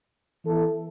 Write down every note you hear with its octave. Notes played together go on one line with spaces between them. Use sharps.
E3 B3 E4 A4